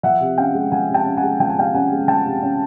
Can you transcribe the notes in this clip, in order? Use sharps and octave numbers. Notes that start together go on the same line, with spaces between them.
F3 E5 F#5
C3
C#4 F5 G5
G#3
F3 F#5 G#5
C3
G5 A5
C#4
F#5 G#5
G#3
F3 G5
G#5
C3 F5 G5
C#4 F#5 G#5
G#3
F3 G5 A5
C3
C#4